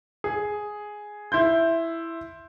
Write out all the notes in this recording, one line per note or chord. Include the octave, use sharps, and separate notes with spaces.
G#4
E4 C6 G6